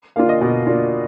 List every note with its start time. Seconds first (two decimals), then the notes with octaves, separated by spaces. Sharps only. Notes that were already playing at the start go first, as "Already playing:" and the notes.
0.16 A#3 D4 F4 F5
0.29 D#5
0.41 B2 D5
0.67 A#3 D4 F4